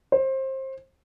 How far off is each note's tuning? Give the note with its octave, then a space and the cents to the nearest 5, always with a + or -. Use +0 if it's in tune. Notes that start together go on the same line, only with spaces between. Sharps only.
C5 +25